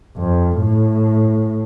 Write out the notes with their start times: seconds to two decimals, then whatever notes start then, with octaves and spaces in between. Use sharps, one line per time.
0.17 F2
0.58 A2